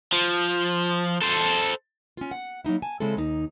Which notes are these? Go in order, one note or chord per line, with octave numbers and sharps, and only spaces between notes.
F3
A4 C5
C#4 F4
F#5
F#3 A#3 D#4 E4
G#5 A5
C#3 G#3 C4 E4 A4
D#2 D#4